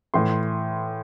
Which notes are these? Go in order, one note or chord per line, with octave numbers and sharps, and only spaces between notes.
A2 E3 C6